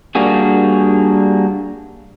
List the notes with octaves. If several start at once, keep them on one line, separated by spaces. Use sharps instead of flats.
G3 A#3 D4 F#4 G#4